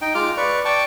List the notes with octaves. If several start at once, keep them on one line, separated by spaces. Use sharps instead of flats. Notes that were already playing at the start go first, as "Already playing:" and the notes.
D#4 G5
G#3 F4 D6 F6
B4 D5 C#6
D5 G5 A5 C#6